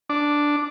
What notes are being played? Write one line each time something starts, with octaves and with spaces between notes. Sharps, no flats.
D4